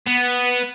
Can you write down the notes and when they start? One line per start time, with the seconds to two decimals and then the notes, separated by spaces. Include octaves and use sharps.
0.07 B3